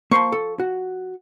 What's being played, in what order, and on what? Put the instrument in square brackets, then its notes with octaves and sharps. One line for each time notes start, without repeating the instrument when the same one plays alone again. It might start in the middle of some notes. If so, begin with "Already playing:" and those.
[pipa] F3 C#6 [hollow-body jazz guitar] A#3 C5 C6
[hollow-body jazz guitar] A4
F#4